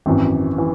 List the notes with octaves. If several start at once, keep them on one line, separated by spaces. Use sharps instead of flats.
G#1 F#2 E3
E3